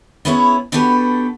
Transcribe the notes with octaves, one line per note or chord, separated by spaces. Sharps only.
B3 C#4 E4 G#4 B4 C#5
B3 D4 F#4 G4 A4 B4